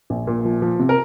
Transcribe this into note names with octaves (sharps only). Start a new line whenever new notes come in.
A#1
A#2
F3
F3
C3
A#4